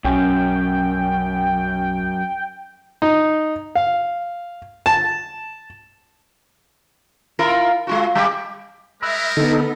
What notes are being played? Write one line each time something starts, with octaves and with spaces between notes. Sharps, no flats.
B1 F#2 C#4 G5
D#4
F5
A5
E4 F4 A#4
G#3 F4 F#4
G3 G4
G3 G#3 A#4 E5 B5 E6 F#6
D3 B3 D#4 A4